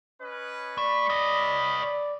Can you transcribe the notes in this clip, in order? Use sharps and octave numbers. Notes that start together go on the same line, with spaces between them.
C#4 B4 D#5
A3 D5 B5
C#5 D#5
D5